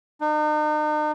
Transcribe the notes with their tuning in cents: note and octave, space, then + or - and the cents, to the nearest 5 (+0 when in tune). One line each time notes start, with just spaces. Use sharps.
D#4 -40